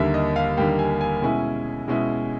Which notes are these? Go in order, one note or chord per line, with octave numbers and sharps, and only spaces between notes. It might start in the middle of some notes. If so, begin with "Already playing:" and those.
Already playing: D#2 D3 G3 A#3 E5
D#5
F5
D#2 D3 G3 A#3 G5
G#5
G#5
B2 G#3 C#4 E4
B2 G#3 C#4 E4